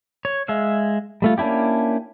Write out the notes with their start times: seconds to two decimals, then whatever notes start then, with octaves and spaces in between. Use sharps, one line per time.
0.25 C#5
0.48 G#3 E5 F5
1.22 G3 A3 F4
1.38 A#3 C#4 D4 E4 G4